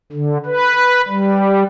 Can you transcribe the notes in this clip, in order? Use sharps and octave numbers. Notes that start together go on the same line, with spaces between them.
D3
B4
G3